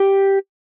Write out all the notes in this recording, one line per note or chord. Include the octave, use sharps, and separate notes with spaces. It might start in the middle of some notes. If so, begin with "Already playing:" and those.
Already playing: G4